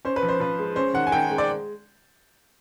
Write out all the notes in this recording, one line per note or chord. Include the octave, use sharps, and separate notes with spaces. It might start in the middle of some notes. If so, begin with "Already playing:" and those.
C#4 C5
B4
F3
C5
F3 B4
G#3
C#4 C5
D#3 F#5
G#5
D#3 G5
G#3
D5